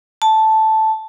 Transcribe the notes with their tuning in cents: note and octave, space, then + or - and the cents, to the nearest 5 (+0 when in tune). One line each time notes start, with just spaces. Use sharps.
A5 -5